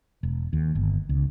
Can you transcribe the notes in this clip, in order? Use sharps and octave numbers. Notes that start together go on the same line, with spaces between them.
E1
D#2
G1
C#2